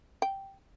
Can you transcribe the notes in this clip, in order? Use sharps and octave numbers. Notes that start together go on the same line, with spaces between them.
G5